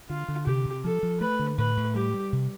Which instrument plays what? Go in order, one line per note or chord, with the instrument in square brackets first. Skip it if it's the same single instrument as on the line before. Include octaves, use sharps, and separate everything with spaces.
[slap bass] D3 [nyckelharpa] F4
[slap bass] D3
[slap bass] C3 [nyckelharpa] G4
[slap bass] C3
[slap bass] F3 [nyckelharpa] A4
[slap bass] F3
[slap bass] A3 [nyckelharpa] B4
[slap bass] D3
[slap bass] A2 [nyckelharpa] B4
[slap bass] A2
[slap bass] G3 [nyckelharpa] G4
[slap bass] G3
C3